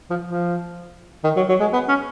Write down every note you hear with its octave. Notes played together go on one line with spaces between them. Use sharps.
F3
F3
D#3
F#3
F#3
G#3
B3
C#4